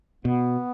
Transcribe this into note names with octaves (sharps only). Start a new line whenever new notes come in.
B2 B3